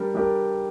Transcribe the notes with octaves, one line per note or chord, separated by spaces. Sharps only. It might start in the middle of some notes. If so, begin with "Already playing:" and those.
Already playing: G3 D4 G4 A#4
G3 D4 G4 A#4